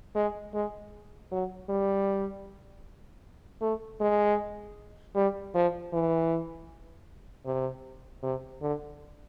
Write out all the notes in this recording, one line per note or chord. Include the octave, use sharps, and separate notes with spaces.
G#3
G#3
F#3
G3
A3
G#3
G3
F3
E3
C3
C3
D3